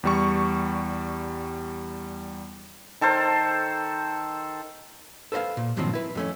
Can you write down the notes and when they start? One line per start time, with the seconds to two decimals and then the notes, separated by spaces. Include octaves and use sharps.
0.03 E2 G3 C#6
3.01 D#3 A4 A#4 C5
5.32 A4 B4 C5 D#5 F5
5.57 A#2
5.77 G2 A#2 D#3 F3 F#3 C4
5.93 E4 B4
6.15 F2 A3 C#4